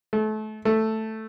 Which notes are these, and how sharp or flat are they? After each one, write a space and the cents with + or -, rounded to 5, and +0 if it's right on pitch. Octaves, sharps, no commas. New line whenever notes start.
A3 -30
A3 +0